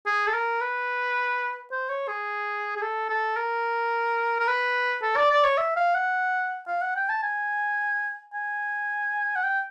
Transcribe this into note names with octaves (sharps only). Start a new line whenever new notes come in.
G#4
A4
A#4
B4
C5
C#5
G#4
G#4
A4
A4
A#4
A#4
B4
A4
D5
D5
C#5
E5
F5
F#5
F5
F#5
G5
A5
G#5
G#5
F#5
G5